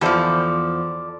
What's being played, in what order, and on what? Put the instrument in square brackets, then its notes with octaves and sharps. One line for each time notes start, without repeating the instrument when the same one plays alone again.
[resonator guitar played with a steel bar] E2 F3 [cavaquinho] A4 C5 D5